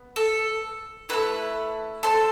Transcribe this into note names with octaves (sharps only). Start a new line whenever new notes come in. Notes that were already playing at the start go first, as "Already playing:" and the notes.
Already playing: B3
A4
A3 C4 E4 B4
A4 C5